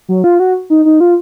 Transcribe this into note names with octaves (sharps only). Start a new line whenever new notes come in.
F#3
F4
F#4
D#4
D#4
F4